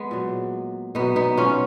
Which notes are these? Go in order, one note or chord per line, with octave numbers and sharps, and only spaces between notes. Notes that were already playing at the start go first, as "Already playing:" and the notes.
Already playing: G#3 B3
A#2 F#3
B2 F#3 B3 D#4
B3 D#4
C#4 F4